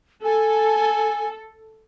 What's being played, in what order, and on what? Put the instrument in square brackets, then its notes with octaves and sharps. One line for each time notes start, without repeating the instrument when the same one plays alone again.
[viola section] A4 [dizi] G#5